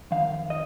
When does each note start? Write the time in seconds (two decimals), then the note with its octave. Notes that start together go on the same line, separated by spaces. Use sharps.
0.11 F2 D#3 F5
0.50 D#5